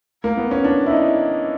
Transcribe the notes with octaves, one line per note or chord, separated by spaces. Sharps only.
A#3
B3
C#4
D4
E4
D#4